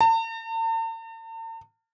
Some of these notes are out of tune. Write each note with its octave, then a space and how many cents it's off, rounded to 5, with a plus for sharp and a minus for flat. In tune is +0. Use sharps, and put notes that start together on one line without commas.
A5 +45